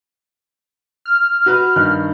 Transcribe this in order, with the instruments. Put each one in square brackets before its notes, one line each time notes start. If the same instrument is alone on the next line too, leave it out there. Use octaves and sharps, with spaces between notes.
[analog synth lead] F6
[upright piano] F#4 B4
G2 D#3 F#6